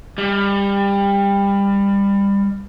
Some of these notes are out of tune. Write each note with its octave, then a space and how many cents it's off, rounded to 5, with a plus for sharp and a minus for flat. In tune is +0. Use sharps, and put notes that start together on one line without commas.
G3 +25